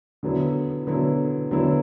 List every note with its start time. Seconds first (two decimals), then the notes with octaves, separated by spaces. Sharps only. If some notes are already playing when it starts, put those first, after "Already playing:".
0.23 D3 F#3 B3 E4
0.87 D3 F#3 B3 E4
1.51 D3 F#3 B3 E4